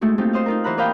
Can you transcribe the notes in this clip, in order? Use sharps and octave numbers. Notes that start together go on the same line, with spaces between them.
G#3 A3 D#4 E4 F#4
A3 A#3 C4 D#4 F4 G4
D#4 C5 D#5 F5
D#4 F4 A#4
E3 C5 F#5 A#5 B5 F#6
A#4 D5 D#5 F5 G5 B5